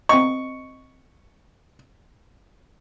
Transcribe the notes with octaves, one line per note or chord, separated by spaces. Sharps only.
C4 D#5 C#6